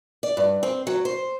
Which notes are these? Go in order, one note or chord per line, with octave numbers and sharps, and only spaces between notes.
D5
G2
C4
F#3
C5